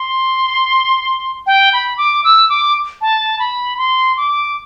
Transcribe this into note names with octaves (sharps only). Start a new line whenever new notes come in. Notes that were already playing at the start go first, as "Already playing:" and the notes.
Already playing: C6
G5
B5
D6
E6
D6
A5
B5
C6
D6